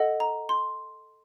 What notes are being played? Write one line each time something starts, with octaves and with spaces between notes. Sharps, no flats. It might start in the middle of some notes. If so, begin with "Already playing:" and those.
Already playing: A4 D#5 F#5
A#5
C6